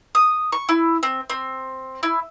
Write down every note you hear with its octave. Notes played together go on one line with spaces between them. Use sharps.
D#6
C#6
E4
C4
C4
E4